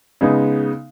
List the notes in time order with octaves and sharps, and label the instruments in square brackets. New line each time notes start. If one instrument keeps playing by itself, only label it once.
[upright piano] C#3 G#3 B3 D#4